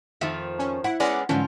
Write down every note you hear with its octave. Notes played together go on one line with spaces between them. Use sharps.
F2 D#3 F3 F4 E5
C#4
E4 F#5
G#3 B3 C#4 D5 F#5
G#2 D3 E3 F3 C#4 F4